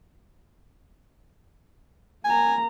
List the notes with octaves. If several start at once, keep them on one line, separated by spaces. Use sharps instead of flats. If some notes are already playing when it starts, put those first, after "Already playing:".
A#3 G#5 A#5